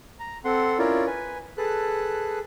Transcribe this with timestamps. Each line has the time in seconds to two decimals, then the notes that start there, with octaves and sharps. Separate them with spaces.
0.20 A#5
0.45 C4 A4 F#5 C6
0.79 C#4 E4 F4 A#4 C#5 D5
1.07 B4 G#5
1.58 G#4 A4 B4 A5 F#6